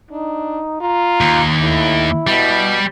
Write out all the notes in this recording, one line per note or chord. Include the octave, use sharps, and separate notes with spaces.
D4 D#4
F4 A#5
D#2
A2 E4
B2 G3